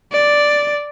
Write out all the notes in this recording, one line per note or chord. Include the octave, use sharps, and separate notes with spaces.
D5